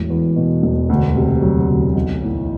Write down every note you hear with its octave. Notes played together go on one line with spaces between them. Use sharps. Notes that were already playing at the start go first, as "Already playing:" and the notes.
Already playing: E1 A2
E2
B2
E1
D2
C3
F#3
D2
B1
A2